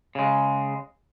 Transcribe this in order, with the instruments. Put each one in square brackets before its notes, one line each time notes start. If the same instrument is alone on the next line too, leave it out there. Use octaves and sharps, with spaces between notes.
[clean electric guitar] C#3 G#3